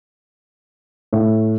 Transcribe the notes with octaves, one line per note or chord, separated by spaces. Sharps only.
A2